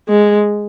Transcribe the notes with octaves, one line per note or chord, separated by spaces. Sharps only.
G#3